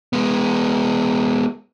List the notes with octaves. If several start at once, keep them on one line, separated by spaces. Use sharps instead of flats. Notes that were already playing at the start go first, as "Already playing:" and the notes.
G#3 B3